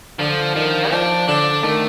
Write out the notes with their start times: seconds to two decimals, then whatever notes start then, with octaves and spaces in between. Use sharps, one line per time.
0.19 D3 F3
0.56 D#3 F3
0.91 F3 D4
1.28 D3 D4
1.63 D#3 A3